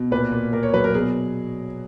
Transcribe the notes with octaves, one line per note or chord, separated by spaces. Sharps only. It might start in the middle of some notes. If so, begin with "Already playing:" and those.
Already playing: B2
A#2 B4
A#2
A#2 A#4
C#5
F#3 B4
A#4
B2 G#4